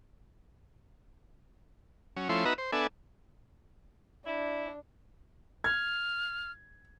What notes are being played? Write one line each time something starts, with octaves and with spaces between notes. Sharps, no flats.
F#3 C#4
F3 A3 C#4 E4 C6
B3 D#4 F#4 B4 E5 A#5
C5
B3 D4 A4 E5 G#5
D4 E4
F6 G#6